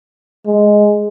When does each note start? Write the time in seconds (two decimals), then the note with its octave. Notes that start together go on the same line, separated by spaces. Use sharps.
0.46 G#3